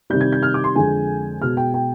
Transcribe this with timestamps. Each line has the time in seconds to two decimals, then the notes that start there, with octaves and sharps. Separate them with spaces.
0.10 C3 D#3 G3 G6
0.21 G#6
0.32 G6
0.43 F6
0.54 D6
0.64 C6
0.76 F2 D3 G#3 G#5
1.41 B2 G#3 F6
1.57 G5
1.74 G5